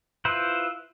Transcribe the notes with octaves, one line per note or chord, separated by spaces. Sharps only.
E4 F4 B4 C5